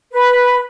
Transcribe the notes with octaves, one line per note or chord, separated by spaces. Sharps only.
B4